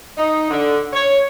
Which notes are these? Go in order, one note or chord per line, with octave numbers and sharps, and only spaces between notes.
D#4
D3
C#5